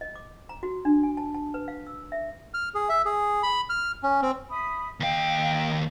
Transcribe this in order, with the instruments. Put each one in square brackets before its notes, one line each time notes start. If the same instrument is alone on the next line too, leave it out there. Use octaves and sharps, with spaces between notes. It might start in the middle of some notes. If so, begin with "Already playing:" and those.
[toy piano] D#5
D6
A#5
F#4
D4
G#5
A5
A5
B4
F5
E6
E5
[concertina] F6
G#4
E5
G#4
B5
F6
C#4
C4
[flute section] E5 B5 D#6
[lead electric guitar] D#2 F5 [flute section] D#5 G5